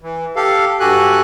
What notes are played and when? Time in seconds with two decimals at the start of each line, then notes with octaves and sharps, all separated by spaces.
0.01 E3
0.36 G4 A4 F5
0.80 G2 F#4 G4 A4 G#5 F#6